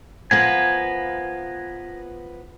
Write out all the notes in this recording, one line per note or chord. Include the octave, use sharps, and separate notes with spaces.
F3 B3 A#4 B4 F5 G#5